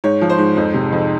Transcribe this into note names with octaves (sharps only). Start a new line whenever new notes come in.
G#2 C#5
F3
C5
G#2
F2
C3
F2